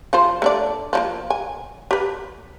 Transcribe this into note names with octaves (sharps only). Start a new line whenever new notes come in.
F3 F4 C5
A3 D4 D5
F3 F#3 A#3
G#5
G4 B4